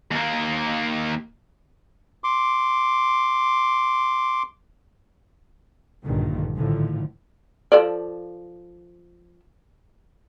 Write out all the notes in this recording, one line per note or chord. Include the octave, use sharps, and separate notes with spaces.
D#2 A#3
C6 D6
A#1 G2 A#2 D3 D#3 G3
A2 D3 D#3 F3
F3 A4 D5